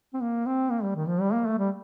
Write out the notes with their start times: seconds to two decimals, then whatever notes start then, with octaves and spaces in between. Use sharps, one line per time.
0.13 C4
0.21 A#3
0.46 C4
0.70 A#3
0.83 G3
0.96 D#3
1.08 F3
1.21 G3
1.33 A#3
1.46 A3
1.58 G3